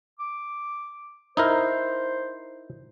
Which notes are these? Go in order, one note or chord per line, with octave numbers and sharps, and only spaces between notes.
D6
D#4 E4 A#4 C5